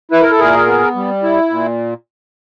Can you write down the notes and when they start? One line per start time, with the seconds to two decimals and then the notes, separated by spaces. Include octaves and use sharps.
0.11 E4 B4
0.22 A#4
0.31 A4
0.39 A#2 G#4 A#4
0.67 B3
0.95 G3
1.23 E4
1.50 A#2